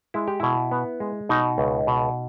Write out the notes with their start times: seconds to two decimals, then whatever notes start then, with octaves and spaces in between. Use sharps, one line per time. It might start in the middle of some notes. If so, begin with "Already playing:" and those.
0.14 G#3 E4
0.28 G4
0.40 B2 E4
0.71 B3
1.00 G#3
1.29 B2 D#4
1.58 C#2
1.87 B2